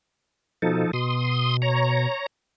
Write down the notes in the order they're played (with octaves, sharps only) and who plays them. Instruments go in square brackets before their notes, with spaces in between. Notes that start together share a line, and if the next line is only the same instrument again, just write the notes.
[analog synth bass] B2 [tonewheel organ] F3 D#4 A4
[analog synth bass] B2 [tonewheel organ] C6 D#6
[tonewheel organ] C#5 A#5